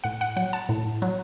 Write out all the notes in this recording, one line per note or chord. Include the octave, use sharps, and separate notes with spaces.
A2 F#5
F#5
F#3 F#5
A5
A2
F#3